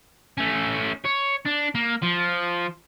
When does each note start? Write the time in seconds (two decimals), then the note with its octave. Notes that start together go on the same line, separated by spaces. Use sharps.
0.38 A3 C#4
1.05 C#5
1.46 D4
1.75 A#3
2.02 F3